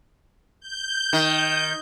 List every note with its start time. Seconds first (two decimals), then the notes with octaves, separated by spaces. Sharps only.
0.60 G6
1.13 D#3